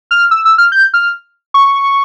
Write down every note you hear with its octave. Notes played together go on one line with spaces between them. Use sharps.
F6
E6
E6
F6
G6
F6
C#6